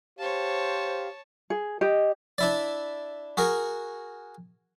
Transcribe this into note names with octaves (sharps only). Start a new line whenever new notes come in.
G4 C5 C#5 F5 A5
G#4
G4 D#5
D4 E4 D5
F#4 G#4 A#4